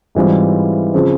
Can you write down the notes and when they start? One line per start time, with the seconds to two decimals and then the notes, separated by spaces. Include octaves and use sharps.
0.15 G#2 E3 G3 C4 F4
0.94 C#3 F3 C4